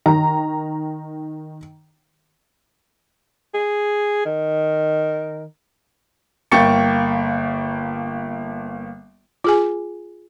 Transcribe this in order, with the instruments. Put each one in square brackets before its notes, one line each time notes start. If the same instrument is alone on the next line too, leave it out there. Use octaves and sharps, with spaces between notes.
[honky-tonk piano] D#3 A#5
[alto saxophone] G#4
D#3
[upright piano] G1 A#3 G5 C#6 A6 C#7
[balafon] F4 G#4 G#5